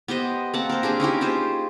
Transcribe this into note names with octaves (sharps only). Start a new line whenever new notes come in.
B3 G4 C5 D#5
A#3 C4 F#5 A5
A#4 C5
C4 D4 G4 G#4
C#4 D#4 E4 G4
F4 G4 G#4 C5